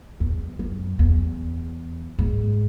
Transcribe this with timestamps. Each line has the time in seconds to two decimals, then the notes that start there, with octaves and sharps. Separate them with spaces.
0.20 E2
0.59 F#2
0.99 E2
2.19 G#2